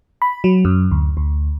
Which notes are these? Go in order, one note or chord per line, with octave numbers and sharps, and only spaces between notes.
B5
F#3
F#2
D2
D2